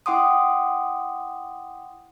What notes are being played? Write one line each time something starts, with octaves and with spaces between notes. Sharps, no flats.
E4 F#5 G5 C6 D6 D#6